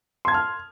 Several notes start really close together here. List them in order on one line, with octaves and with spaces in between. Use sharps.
C6 G#6 A5 F6